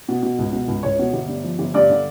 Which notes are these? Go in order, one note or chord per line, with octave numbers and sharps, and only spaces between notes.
B2
B2
C#2
B2
C#2
C#2 C#5
B2
G1
G2
F3
G1
G2 D5
D3